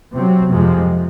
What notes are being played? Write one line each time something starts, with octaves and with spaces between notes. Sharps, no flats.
C3 F#3 C4
F2 C3 F3 G#3